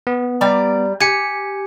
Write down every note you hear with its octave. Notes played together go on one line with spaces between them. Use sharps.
B3
G3 D5 A#5
G4 G#5 C#7